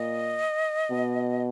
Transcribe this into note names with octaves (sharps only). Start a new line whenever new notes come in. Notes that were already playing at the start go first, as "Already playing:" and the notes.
Already playing: A#2 D#5
B2